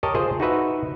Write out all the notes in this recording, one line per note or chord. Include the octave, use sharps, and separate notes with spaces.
G4 A#4 C#5 D#5 A5
F4 G#4 C5 D#5
D#4 F#4 B4 E5